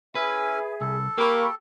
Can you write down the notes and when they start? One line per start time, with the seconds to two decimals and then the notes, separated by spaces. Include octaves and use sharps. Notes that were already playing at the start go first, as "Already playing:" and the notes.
0.15 C#4 E4 G#4 B4 E5 G#5
0.81 C2 A4
1.18 A#3 G4 B5 C#6